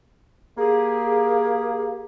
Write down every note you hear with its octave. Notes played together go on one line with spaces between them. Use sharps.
A#3 G4 G#4